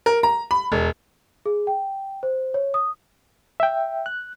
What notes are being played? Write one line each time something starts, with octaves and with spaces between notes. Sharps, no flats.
A#4
A#5
B5
E1
G#4
G5
C5
C#5
D#6
E5 G5
F#6